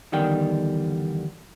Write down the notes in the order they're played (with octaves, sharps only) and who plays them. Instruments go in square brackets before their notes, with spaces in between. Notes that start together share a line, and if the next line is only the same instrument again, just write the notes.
[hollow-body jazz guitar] E2 D3 D#3 G3 G5